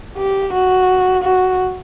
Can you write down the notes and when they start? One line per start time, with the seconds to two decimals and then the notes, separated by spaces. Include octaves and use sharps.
0.18 G4
0.53 F#4
1.23 F#4